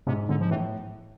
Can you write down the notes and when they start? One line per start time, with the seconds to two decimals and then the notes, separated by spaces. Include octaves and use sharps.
0.07 G#2 C3
0.29 G#2 D3
0.40 F3
0.50 A2 E3